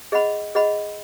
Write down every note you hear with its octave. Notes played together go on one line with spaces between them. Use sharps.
G#4 D#5 F#5 B5
G#4 D#5 F#5 B5